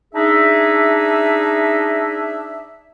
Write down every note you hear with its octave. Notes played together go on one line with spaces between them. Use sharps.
D4 D#4 G#4 E5